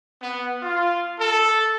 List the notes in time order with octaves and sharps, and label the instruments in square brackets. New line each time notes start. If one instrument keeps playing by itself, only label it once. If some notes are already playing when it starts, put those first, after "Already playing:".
[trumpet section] B3
F4
A4